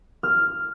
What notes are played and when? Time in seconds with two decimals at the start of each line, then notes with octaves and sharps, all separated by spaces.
0.23 F6